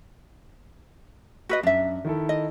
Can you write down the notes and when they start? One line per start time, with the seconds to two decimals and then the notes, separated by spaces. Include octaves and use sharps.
1.49 F#4 B4 D#5
1.63 F#2 D4 E5
2.05 D#3 E4 A4
2.29 D#5